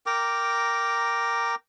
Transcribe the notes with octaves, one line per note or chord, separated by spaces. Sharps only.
A#4 G5 A#5 D6